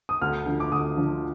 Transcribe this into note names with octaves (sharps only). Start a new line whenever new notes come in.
D#6
D2 F6
D3 F3
D6
D2 D#6
D3 F3